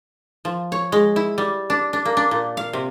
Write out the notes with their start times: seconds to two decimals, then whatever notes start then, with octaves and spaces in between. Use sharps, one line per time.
0.45 F3
0.72 C#5
0.92 G#3
1.16 E4
1.38 G3
1.70 D4
1.93 D4
2.05 A#3
2.17 D4
2.31 A#2
2.57 F5
2.73 C3